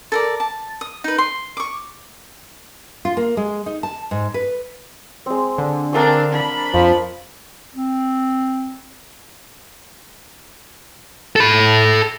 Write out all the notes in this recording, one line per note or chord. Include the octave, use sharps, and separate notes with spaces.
A4 A#4 D5
A5
D#6
D#4 B4
C6
C#6 D6
F4
A#3
G#3
D#4
A5
G#2
B4
G#3 C4
D3
C4 D4 A#4 F5 D#6
D4 B5
F2 F3
C4
A4 B5